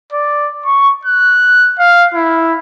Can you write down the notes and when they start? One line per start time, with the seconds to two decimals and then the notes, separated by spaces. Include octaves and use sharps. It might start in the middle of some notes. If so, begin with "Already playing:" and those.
0.12 D5
0.66 C#6
1.05 F#6
1.79 F5
2.14 E4